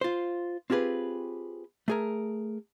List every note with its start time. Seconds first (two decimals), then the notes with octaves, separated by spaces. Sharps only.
0.01 F4 C5
0.70 C4 F4 G4 G#4 B4
1.88 A3 G#4 A#4